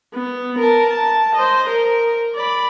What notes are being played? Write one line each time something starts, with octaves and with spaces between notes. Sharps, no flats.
B3
A#4 A5
A5
C5 D#5
A#4
D5 B5